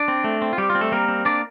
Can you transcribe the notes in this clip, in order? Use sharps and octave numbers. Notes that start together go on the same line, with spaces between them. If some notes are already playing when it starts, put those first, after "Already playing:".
Already playing: D4 D5
C4
A3
C4
F4
G3 G4
F4
C4
A3 A4
G3 A#3 A#4
C4
A#3 D4 D5